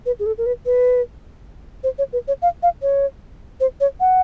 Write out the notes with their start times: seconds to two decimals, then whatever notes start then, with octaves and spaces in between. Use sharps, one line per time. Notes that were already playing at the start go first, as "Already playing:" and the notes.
0.06 B4
0.19 G#4
0.26 A4
0.38 A#4
0.46 B4
0.66 B4
1.84 C5
1.98 C#5
2.13 B4
2.28 C#5
2.42 F5
2.63 F5
2.82 C#5
3.60 C5
3.80 C#5
4.00 F#5